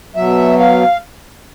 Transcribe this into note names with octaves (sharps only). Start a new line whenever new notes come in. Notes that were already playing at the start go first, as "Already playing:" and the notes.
B2 F#3 E5
F5